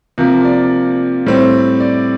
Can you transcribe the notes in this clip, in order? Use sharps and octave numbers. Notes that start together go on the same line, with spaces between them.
C3 F3 A#3
D5
A2 G3 C4
D5